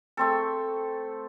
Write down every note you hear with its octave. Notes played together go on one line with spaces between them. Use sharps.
A3 C4 A4